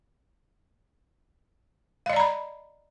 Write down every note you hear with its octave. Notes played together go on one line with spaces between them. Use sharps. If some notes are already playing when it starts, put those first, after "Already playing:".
D5 D#5 F5 A#5 B5